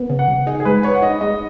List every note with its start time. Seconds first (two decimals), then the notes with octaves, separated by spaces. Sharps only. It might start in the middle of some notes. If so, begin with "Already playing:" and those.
Already playing: B3
0.09 C#3
0.19 F#5
0.28 C#2
0.46 D#4 G#4
0.60 G#4
0.65 G#3 B4
0.83 B4 C#5
0.95 F#5
1.02 D#4 D#5
1.21 G#3 D#5